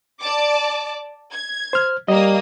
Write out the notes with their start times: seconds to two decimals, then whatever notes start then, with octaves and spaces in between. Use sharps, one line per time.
0.21 D5 A5 D6
1.31 G#6
1.73 C5 F6
2.08 G3 A#3 D#5 D#6